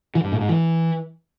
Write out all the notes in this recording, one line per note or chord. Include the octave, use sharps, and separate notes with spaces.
E3
G2
A2
G#2
E3